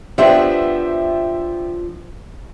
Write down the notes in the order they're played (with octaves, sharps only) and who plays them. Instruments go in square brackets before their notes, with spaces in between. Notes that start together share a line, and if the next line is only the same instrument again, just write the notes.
[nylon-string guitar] F3 B3 D4 [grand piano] G4 C5 E5